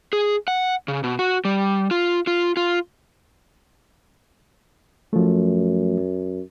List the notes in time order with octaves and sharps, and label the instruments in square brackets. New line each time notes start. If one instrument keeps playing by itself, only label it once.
[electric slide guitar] G#4
F#5
C#3
B2
F#4
G3
F4
F4
F4
[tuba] F#2 [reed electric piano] F3 A3